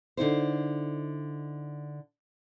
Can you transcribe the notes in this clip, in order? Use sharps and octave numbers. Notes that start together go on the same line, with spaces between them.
D3 D#4 E4 C5